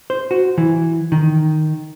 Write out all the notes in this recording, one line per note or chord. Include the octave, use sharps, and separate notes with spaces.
C5
F#4
E3
D#3